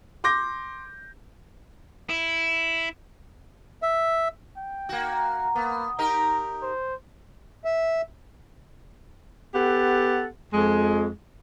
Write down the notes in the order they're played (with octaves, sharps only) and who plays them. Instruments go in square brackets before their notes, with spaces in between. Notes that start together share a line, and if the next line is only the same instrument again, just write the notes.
[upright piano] C6 D6 G6 A#6
[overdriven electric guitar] E4
[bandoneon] E5
[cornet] G5
[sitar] A#3 F#4
[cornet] A#3 [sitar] B3
[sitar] D#4 G4 A#4 [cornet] A#5
[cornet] C5
[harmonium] E5
[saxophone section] B3 G4 A4 F#5
F2 G#3